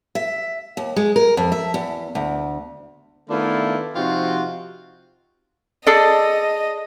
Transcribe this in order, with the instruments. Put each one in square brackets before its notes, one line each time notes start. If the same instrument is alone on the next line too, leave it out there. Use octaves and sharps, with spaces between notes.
[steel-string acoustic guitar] E5
D#2
G#3
A#4
F2
E5
E2
D2
[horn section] D#3 A3 B3 D4 E4 F4
C3 F3 D#4 F4 F#4 G5
[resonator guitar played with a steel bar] G#4 A4 D5 [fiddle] D#5